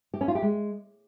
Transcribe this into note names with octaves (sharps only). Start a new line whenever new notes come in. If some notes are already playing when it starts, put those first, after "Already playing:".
G4
C#4
F4
G4
G#3